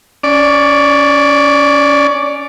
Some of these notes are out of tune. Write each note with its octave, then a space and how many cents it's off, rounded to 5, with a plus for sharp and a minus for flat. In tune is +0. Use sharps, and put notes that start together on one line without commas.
C#4 +20 D5 +0